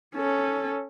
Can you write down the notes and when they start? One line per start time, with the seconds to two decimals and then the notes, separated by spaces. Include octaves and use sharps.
0.16 C#4 A4